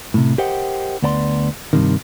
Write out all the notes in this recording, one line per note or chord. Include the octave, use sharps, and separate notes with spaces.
A2 C3
G4 A#4 C5 D#5 F#5 G5
D2 B3 D5 A#5 C6
G2 C3 D#3